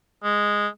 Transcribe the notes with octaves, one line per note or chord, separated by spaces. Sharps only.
G#3